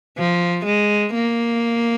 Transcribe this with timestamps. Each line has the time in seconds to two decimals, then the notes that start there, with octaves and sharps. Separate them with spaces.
0.18 F3
0.66 G#3
1.14 A#3